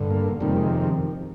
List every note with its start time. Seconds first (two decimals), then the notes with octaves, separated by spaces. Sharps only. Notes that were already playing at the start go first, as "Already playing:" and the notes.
Already playing: G2 D3
0.10 A#3
0.40 F2 C3 D#3 G3
0.56 G#3